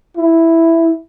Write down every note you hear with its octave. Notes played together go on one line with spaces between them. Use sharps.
E4